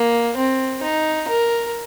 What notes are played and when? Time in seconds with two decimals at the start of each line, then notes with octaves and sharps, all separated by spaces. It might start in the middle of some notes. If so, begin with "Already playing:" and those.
Already playing: A#3
0.37 C4
0.83 D#4
1.28 A#4